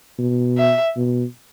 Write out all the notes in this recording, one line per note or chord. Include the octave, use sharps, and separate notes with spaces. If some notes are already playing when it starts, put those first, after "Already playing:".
B2
E5
B2